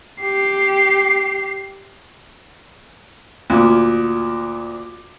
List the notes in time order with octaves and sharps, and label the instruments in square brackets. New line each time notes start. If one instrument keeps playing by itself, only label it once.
[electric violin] G4 C7
[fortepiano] D2 A#2